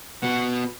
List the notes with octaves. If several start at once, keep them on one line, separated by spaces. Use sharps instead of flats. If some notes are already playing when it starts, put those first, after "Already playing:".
B2 F#5